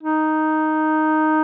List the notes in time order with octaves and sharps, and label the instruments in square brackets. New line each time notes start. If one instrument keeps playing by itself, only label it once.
[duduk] D#4